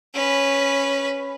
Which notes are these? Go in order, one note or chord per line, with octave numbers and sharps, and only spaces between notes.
C#4 B4